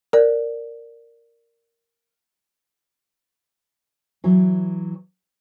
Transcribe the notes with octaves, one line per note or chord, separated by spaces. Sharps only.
A#4 D5
E3 F#3